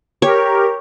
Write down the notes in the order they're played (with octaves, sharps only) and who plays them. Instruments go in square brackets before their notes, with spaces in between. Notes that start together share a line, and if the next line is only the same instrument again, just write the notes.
[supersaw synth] G4 A#4 [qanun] C#5